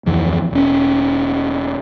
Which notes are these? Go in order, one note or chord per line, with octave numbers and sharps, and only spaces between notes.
D1 F2 E3
E1 C#4